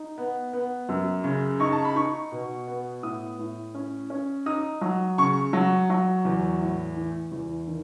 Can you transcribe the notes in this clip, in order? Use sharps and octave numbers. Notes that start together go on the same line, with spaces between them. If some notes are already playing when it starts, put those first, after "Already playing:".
Already playing: D#4
B3
B3
F#2
C#3
D#4 C#6
A5
B5
D#4 C#6
B2
B3
A2 D#6
A2
C#4
C#4
D#4 D#6
F#3
C#3 C#6
F#3
F#3
E2
A2
E3
E2
D#3